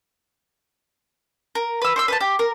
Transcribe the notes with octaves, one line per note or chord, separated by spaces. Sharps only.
A#4
B4 E6
C5 C#6 E6
B4 C5 A5
G4
A#4